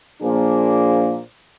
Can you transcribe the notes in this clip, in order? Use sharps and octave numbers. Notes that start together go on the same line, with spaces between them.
A#2 F3 A#3 D4 G#4 C5